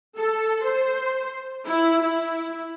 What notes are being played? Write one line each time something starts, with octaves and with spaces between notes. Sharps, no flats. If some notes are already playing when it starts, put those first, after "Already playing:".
A4
C5
E4
E4